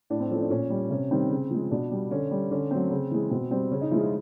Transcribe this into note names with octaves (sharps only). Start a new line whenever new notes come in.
A2 D4
C4
F3 A3 C#4
D4
A#2 C#4
G3
C3 C#4
D#3 G3 C4
C#3
F3 G#3
B2 D4
G3
D3 C#4
G3
D3 C#4
F#3 A3 C4
C#3
E3 G#3
B2 C4
G3 C4
C#3 C#4
D#4
F3 G#3 E4
F4